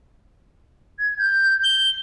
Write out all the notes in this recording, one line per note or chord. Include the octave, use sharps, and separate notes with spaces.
G#6
G6
G7